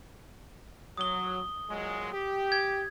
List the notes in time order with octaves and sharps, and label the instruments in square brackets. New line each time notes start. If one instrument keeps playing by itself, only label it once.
[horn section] F#3 [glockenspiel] D#6 G7
[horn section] A#2 F#3 G#3
G4
[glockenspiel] G#6